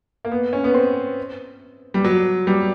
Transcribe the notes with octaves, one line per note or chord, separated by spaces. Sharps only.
A#3
B3
C#4
B3
C4
G3
F#3
G3